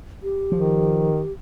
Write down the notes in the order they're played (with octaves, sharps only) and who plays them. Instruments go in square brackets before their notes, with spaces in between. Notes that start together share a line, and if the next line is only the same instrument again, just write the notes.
[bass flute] G4
[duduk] D#3 [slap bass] F3